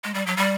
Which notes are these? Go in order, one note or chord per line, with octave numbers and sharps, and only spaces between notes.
G#3
G3
F#3
G3